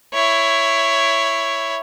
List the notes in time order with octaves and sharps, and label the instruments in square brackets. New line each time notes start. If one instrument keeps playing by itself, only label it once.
[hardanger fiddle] E4 C#5